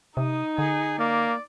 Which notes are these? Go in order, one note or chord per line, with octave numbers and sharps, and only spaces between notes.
C3 D#4 D#6
D3 G#4
A#3 D5